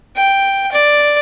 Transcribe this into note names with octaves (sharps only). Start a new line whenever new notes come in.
G5
D5